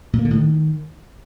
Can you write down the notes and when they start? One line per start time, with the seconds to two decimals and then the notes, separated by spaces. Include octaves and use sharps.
0.13 A#2
0.19 A#3
0.25 D3
0.31 A2
0.36 D#3